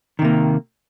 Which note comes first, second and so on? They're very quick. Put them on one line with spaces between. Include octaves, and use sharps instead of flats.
D#3 C3 A#3